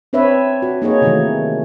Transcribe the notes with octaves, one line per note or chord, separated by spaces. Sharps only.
C4 D4 B4 C#5 E5
F#4
A#3 D#4 G#4 C#5
C3 D#3 E3 F#3 A3